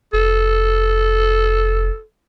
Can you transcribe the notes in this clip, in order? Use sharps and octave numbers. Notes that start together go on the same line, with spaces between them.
F1 A4